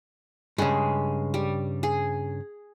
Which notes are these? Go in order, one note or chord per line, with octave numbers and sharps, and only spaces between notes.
G2 C#3 G#3
G3
G#4